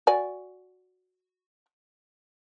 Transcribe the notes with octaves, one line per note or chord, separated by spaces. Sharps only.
F#4 D5 G#5